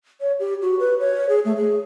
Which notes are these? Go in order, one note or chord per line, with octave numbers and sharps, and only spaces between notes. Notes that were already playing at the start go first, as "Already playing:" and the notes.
C#5
G4
F#4
B4
C#5
G#4
A3
G#4